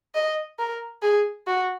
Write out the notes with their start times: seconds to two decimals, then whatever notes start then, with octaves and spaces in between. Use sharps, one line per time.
0.15 D#5
0.59 A#4
1.03 G#4
1.47 F#4